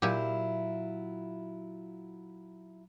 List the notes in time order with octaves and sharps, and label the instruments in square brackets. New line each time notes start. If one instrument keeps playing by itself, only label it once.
[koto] A#2 G4 [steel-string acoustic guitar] F#3 E4 F4